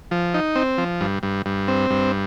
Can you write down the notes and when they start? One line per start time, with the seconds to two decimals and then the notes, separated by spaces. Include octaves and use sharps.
0.11 F3
0.34 D#4
0.56 C4
0.78 F3
1.01 G2
1.23 G2
1.46 G2
1.68 C4
1.90 G2